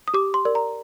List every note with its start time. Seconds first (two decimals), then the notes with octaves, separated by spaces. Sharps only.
0.08 D#6
0.14 G4 D6
0.34 C6
0.45 A#4 D5
0.55 A#5